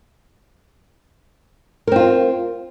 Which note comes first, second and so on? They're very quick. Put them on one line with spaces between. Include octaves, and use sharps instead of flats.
A#4 C4 F4